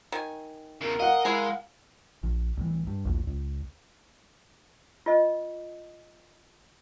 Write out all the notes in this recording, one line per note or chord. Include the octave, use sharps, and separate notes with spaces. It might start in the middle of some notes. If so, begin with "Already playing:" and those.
D#3 G#5
E2 C#3 A#4
D#5 F5 F#5
G#3 E4 G#4
A#1
C2 A2 E3
G2
A#1 D#2 A2
C#2
F4 D#5